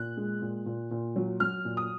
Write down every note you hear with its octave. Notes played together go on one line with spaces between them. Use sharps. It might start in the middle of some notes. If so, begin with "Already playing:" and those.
Already playing: A#2 F#6
G#3
A#2
A#2
A#2
F#3
F#3 F6
A#2
D#6